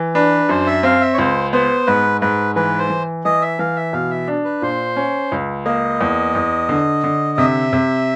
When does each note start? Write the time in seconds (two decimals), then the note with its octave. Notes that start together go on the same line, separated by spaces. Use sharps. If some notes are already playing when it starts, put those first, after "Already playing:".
Already playing: E3
0.14 D4 B4
0.49 F#2 C5
0.67 E5
0.83 C4 F5
1.01 E5
1.14 C#5
1.18 C#2 C5
1.52 B3 C5
1.87 G#2 B4
2.21 G#2 B4
2.55 E3 B4
2.79 C5
2.90 E3
3.25 E3 D#5
3.41 E5
3.59 E3 F5
3.76 E5
3.93 B2 F5
4.11 E5
4.28 D4
4.45 B4
4.62 A#2 C5
4.96 C#4
5.32 C#2
5.65 A#3 D#5
6.01 E2
6.35 E2
6.69 D3
7.04 D3
7.38 C3 E5
7.73 C3